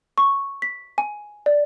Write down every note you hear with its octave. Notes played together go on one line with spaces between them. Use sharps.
C#6
B6
G#5
D5